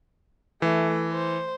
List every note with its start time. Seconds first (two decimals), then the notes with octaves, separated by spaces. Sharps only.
0.62 E3 A3
1.12 C5